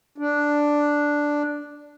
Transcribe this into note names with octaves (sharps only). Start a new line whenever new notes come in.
D4